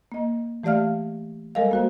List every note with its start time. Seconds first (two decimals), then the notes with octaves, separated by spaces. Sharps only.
0.12 A#3 D#5
0.64 E3 A3 G4 D5 F5 F6
1.55 G3 G#3 A4 A#4 D#5 F5
1.71 A#3 F#4 C5